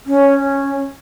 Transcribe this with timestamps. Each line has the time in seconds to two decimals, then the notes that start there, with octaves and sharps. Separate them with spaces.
0.06 C#4